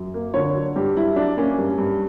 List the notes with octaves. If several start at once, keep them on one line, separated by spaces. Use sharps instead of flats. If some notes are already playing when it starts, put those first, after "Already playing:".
Already playing: F#2
A#3
D3 C#5
F#3
G2 G4
G2 E4
F#3 D4
A#3 C#4
G2
G2